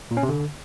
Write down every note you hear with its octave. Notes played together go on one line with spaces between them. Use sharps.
A#2
C#4
C3
D3